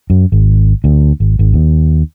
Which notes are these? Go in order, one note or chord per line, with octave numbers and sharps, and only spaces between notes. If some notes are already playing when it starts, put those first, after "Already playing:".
F#2
G#1
D2
G#1
G#1
D#2